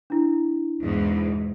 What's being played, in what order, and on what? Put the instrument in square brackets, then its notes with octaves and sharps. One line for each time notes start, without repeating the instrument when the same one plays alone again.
[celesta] D4 E4
[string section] B1 E2 G#2